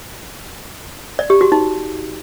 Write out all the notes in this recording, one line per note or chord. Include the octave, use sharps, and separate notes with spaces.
D5
G4
F#4
D#4